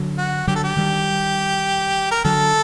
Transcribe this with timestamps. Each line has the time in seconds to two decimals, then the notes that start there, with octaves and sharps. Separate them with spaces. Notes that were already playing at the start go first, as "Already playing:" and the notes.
Already playing: D3 F#3
0.18 F#4
0.47 D3 F#3 G4
0.56 A4
0.64 G4
0.77 D#3 G3
2.11 A#4
2.25 D3 F#3 A4